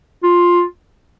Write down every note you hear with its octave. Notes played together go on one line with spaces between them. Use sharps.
F4